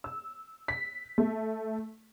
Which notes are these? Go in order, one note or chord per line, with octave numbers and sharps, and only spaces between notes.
E6
B6
A3